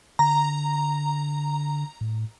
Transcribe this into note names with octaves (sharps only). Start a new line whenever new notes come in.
D3 A#5
A2